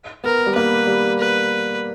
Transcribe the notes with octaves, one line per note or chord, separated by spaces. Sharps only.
B3 A#4
G3
A#3 B4
G3
B4